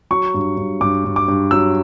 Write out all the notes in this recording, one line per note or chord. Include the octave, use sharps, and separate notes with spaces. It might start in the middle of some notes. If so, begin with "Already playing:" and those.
F#3 C#6
G2
G2
G2 D6
G2
D6
G2
F#3 E6